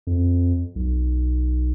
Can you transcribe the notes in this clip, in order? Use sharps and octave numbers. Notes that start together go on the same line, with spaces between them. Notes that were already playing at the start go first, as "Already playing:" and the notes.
F2
B1